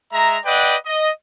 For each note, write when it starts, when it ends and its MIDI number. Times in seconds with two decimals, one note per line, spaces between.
0.13 0.36 56
0.13 0.36 76
0.13 0.36 82
0.45 0.75 71
0.45 0.75 74
0.45 0.75 75
0.45 0.75 78
0.45 0.75 79
0.86 1.09 75